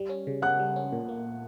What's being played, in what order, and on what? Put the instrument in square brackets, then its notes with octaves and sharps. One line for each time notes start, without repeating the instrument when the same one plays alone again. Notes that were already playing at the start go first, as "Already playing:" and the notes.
Already playing: [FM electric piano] G3
C#4
C#3
[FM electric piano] C#3 [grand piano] F#5 F#6
[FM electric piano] G3
C#4
A#2
A#3